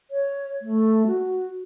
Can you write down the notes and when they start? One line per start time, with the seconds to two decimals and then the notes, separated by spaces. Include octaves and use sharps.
0.11 C#5
0.62 A3
1.07 F#4